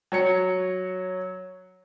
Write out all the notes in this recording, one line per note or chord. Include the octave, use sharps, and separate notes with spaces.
F#3 C#5 C#7